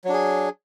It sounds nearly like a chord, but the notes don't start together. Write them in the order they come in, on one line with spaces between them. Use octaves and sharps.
F#3 D4 G#4